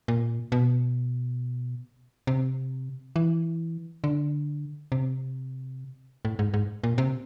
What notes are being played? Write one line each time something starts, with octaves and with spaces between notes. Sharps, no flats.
A#2
B2
C3
E3
D3
C3
A2
G#2
G#2
A#2
C3